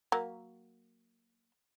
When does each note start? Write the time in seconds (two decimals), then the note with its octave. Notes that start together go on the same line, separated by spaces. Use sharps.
0.12 F#3 A#3